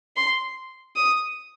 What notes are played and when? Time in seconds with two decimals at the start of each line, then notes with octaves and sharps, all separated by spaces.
0.16 C6
0.96 D#6